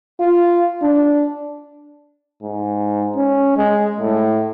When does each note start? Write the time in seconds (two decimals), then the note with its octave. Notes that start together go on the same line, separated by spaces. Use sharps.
0.20 F4
0.82 D4
2.43 G#2
3.16 C#4
3.57 G#3
4.00 A2